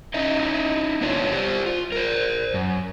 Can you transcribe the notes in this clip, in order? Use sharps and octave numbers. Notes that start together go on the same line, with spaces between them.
C#4 D#4 E4 D#5
A#3 B3 D4 F4 C#5
G4 C5 D5
F4
A#4 C5
F#2